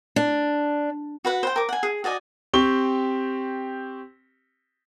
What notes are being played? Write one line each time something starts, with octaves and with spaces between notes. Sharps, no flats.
D4
F#4 B4 F#5
C5 G5
A#4 D6
F#5 G#5
G#4
F#4 D5 D#5 G#5
C4 G4 C#6 G7